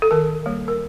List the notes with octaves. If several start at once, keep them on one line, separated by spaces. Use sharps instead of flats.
A4
D#3 A#4
G3 A#3
A#4